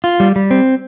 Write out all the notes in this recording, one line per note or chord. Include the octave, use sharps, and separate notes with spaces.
F4
G3
G3
C4